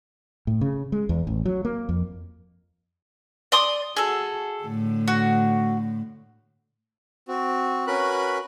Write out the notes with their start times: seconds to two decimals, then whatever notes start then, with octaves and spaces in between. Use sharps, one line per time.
0.47 A2
0.61 C#3
0.92 G#3
1.09 E2
1.27 A1
1.46 F#3
1.65 A#3
1.89 F2
3.52 D5 C6 D#6
3.97 F#4 G#4 A4
4.64 A2 D3
5.08 F#4
7.28 C4 F#4
7.87 C#4 F#4 A#4 B4 B5 F#6